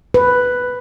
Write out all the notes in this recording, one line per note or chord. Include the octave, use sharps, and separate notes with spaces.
B4